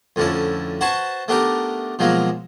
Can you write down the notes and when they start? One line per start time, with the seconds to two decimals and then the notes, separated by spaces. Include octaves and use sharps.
0.16 F2 A2 D3 C#4 E4
0.81 F#4 B4 C5 G#5 A5 C#6
1.28 A3 B3 D4 D#4 G4 A#4
1.99 B2 F3 F#3 G#3 A#3